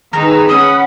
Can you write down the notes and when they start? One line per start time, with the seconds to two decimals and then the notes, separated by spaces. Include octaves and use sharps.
0.13 D#3 D#4 G#4 B4 A#5 E6
0.48 C#4 F#5 B5 D#6